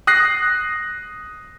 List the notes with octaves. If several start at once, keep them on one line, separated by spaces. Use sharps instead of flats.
D#6 F#6 A#6 C7